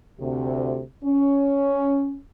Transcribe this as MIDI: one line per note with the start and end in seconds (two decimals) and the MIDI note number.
0.20 0.81 38
0.20 0.81 48
1.05 2.18 61